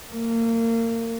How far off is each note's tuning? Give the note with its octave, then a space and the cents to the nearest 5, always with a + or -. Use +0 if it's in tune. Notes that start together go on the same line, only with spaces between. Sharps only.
A#3 -30